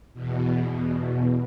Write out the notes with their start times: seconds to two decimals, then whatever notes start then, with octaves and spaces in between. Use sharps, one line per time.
0.14 E2 B2
0.69 E2 B2